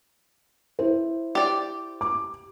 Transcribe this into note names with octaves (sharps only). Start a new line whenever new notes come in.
E4 C5
G4 D5
D6